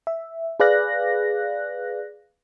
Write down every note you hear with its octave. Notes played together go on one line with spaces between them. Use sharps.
E5
G#4 B4 D5 F5 F#6 A#6